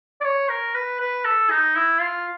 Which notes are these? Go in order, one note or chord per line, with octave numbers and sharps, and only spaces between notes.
D5
C#5
A#4
B4
B4
A4
D#4
E4
F4